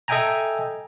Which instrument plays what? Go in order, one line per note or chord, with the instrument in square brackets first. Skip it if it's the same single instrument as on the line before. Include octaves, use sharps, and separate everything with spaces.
[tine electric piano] A4 D#5 E5 G5 G#5 A#5